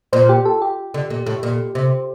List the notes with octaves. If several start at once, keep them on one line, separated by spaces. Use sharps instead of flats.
A#2 C5
G4
A4
G4
D3
A#2
A2
A#2
C3